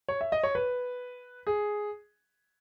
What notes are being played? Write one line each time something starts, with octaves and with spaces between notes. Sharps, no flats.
C#5
E5
D#5
C#5
B4
G#4